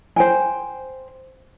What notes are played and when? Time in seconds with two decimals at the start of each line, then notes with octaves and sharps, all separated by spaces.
0.16 C5 G5 G#5